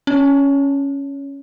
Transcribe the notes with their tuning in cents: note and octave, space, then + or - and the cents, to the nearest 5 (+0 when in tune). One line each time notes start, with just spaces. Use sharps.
C#4 +0 C#5 +25